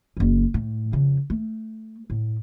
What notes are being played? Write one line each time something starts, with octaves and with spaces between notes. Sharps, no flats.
F#1 F#2
A2
F2 C#3
A3
A2